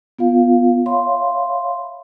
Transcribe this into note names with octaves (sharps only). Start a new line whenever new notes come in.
B3 F4 F5
C#5 E5 F5 B5 C6